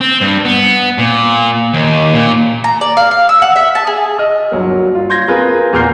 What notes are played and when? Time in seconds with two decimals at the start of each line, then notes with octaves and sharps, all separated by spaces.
0.01 C4
0.21 G2
0.45 B3
0.98 A#2
1.73 D#2
2.14 A#2
2.64 A#5
2.81 D5
2.97 F5
3.11 F5
3.29 E6
3.42 F#5
3.56 E5
3.75 A5
3.87 G#4
4.18 D#5 F6
4.51 G1 F#3 A#3
4.95 F4
5.10 C6 G6 G#6 A#6
5.28 C4 F4 G#4 A#4 B4
5.73 E2 A#2 A#4 F6 G6 C7